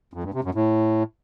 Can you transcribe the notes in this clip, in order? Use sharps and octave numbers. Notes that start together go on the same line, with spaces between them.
F2
G2
C3
F#2
A2